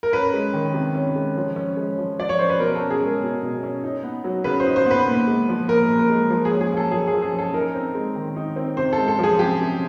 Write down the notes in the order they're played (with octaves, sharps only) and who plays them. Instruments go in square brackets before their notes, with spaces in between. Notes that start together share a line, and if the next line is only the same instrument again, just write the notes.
[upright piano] A#4
C#4 B4
G#3
D#3
C3
C#4
G#3
F3
C#4
G#3
F3
F3 D5
C#5
C#4 C5
B4
B2 A#4
C#4 A4
G#4
G#3 A#4
B2
B2
C#4
D#4
B3
F#3
C#3 B4
C5
D#4
C5
B3
B4
A#2
G#3
F3
A#2 A#4
A#2
A#4
G#3
F3
G#4
C#4
G#4
A#3
A4
F3 G#4
F3 G#4
G#4
C#4 A4
D#4 A#4
C4
G#3
D#3
D#4
C4
C3 C5
A4
G#3
A4
F3 G#4
C3 G4
C3